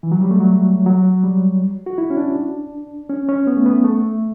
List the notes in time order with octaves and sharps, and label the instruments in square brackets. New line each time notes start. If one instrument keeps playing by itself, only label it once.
[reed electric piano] E3
F#3
G3
A3
F#3
F#3
G3
F#4
E4
C#4
D4
C#4
C#4
B3
A3
B3
A3